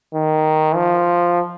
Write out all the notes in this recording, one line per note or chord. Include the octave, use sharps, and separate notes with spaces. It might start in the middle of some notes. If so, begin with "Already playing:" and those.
D#3
F3